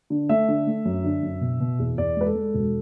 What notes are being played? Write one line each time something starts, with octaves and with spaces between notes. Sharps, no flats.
D3
A3 E5
D3
A3
F#2
D3
F#2
B2
B2
E2
E2 D5
G#3 B4
A4
G#3
E1